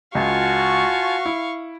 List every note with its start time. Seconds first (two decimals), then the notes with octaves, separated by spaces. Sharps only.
0.15 C#2 F4 F#4 F5 G#5 A5 C#6
1.26 E4